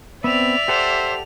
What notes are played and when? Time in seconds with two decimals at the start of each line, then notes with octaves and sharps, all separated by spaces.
0.24 B3 C4 D5 E5 F7
0.68 G4 A4 C5 F#5